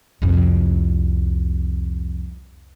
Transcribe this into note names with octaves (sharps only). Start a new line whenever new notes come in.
C2 F2